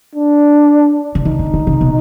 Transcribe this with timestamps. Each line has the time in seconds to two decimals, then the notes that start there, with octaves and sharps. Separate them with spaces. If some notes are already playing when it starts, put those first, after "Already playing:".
0.15 D4
1.15 D3
1.25 D#3 D#4
1.39 D3
1.54 D3
1.67 C#3
1.81 B2